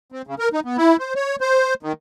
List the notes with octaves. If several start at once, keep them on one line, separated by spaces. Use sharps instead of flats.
C4
C#3
A#4
D#4
B3
E4
C5
C#5
C5
D#3